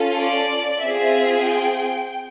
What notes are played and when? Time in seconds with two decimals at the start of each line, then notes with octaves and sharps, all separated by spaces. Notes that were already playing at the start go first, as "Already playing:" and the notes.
Already playing: C#4 F4 A4
0.21 D5
0.83 C4 F4 G#4 E5
1.46 G5